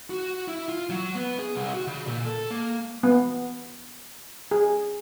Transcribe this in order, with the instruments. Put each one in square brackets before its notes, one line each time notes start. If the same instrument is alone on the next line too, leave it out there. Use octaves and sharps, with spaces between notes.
[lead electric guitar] F#4
E4
F4
F#3
B3
G#4
C2
F#4
C#3
A#2
A4
A#3
[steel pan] B3
G#4